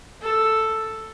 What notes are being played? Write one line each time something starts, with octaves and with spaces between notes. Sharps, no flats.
A4